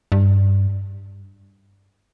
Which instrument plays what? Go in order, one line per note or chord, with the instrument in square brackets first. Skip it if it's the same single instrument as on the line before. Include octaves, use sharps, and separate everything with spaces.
[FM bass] G2